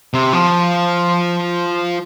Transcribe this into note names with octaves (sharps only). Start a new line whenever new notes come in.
C3
F3